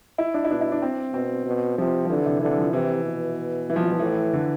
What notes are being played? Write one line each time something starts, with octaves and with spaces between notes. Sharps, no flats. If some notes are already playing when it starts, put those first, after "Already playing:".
E4
D4
E4
B2 D4
E4
D4
C4
B2 C4
B2
C3 F3
F3
D3 E3
C3
D3 E3
F3
C3 E3
B2
E3
F3
E3
F3
A2 E3
D3